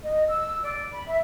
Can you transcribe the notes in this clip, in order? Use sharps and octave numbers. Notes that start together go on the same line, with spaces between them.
D#5
E6
D5
B5
E5